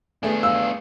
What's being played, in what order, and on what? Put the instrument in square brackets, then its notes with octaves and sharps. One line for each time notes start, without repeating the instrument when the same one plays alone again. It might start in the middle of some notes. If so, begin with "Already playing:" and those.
[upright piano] A3 G#4 [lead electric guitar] B3 D4
[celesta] F5 [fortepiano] E6